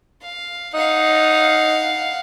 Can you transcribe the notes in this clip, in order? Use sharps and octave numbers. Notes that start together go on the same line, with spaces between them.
F5
D#4 F5 F#5